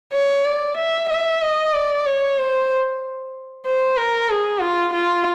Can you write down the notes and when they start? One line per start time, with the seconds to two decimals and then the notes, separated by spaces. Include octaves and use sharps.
0.13 C#5
0.45 D5
0.77 E5
1.09 E5
1.42 D#5
1.74 D5
2.06 C#5
2.38 C5
3.66 C5
3.97 A#4
4.30 G#4
4.61 F4
4.93 F4